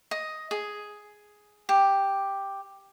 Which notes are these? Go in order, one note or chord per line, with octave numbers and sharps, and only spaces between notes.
D#5
G#4
G4